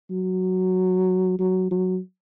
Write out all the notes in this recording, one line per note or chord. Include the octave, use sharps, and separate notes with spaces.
F#3
F#3
F#3